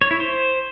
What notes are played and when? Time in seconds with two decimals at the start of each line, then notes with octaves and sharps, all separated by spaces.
0.01 C#5
0.11 E4
0.20 C5